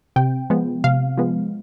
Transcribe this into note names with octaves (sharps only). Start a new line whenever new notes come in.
C3 G5
F3 G#3 B3
C3 F5
F3 G#3 B3